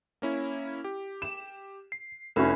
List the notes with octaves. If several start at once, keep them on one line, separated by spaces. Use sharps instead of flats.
A#3 C#4 E4
G4
E7
C7
F1 C#4 E4 F#4